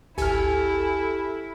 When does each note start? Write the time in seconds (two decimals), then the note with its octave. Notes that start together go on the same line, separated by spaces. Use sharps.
0.18 G#1 D2 E4 G4 A4 G#5 F6